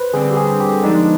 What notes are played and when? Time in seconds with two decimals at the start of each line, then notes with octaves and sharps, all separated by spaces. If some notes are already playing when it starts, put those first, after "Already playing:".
Already playing: B4 C5
0.14 D3 G3 C4 G#4
0.31 G4
0.37 G#4
0.60 G4
0.83 D3 F3 G#3 B3 D4 D#4